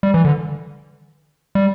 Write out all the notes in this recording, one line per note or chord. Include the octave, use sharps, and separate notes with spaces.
G3
E3
D3
G3